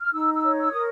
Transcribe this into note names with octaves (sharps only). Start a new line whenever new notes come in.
F6
D#4 E6
E6
C#5
E6
A#4 D#6